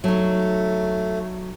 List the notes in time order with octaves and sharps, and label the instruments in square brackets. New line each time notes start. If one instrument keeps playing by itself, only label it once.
[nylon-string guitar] F#3 D#4 [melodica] A3